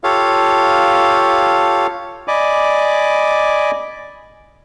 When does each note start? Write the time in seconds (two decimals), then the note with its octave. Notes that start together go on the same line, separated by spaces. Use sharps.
0.04 F4 G4 A4 C#5 F5
2.28 D5 D#5 G#5 B5 D6